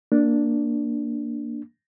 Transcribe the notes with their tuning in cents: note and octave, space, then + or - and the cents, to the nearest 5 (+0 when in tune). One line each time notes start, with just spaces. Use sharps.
A#3 +0 D4 +0